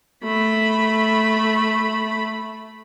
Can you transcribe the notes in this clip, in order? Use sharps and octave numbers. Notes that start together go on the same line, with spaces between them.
A3 B5